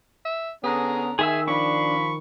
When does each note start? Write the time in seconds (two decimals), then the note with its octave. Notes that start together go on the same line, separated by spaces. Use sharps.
0.25 E5
0.64 D3 B3 C#4 G#4 A#5 D#6
1.19 D#3 G#4 E5 G#5 E6
1.48 F3 D4 B5 C#6